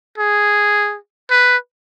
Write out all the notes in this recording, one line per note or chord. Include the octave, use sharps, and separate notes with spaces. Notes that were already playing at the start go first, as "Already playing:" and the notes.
G#4
B4